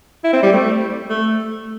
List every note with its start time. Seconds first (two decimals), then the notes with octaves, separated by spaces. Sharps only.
0.24 E4
0.33 C4
0.43 G3
0.53 A3
1.09 A3